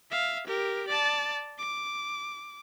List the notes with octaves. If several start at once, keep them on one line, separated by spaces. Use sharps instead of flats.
E5 F5
G4 A#4
D5 A5
D6